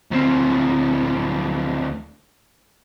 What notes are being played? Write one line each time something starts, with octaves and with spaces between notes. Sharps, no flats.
D2 C4